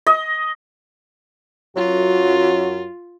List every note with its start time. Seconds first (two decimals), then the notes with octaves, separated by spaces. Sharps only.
0.07 D#5
1.76 F#2 F#3 F4 F#4